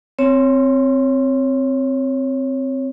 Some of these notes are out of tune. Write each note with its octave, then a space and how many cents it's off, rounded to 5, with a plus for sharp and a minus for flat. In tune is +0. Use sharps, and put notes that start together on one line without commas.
C4 +0 C#5 -5